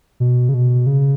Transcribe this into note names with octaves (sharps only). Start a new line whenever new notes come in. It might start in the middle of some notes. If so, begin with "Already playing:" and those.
B2
C#3
B2
C#3